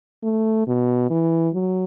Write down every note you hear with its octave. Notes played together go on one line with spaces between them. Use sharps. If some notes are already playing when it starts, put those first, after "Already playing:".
A3
B2
E3
F#3